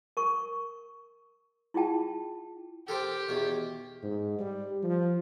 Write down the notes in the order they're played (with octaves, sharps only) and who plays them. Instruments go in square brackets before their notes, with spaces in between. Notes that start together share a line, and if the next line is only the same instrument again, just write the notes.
[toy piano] A#4 C#6
E4 F4 G#4 G5 A5
[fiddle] G4 [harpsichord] A4 A#4 C5
[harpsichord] E2 B2 D#3
[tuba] G#2
G3
F3